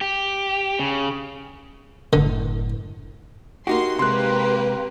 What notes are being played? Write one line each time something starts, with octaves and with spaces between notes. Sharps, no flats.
G4
C#3
F#1 A2 D3
A#3 D#4 F#4 G4 C6
C3 G#3 A#3 G4 B4 C6 F#6